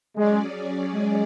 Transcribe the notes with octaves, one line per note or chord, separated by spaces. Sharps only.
F#3 G#3 C#4 G#4 D5
G#3